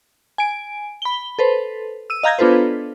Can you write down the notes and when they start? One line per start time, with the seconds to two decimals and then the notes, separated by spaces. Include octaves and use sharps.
0.38 G#5 D7
1.02 B5 G7
1.39 A4 B4 C5
2.10 E6 D#7
2.23 D#5 F5 A#5 G6 G#6 A#6
2.39 B3 D4 F4 A4 B4 C5